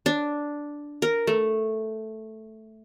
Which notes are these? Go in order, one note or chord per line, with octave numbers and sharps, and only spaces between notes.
D4
A#4
A3